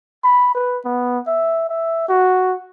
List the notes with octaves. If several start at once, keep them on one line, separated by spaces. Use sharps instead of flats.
B5
B4
B3
E5
E5
F#4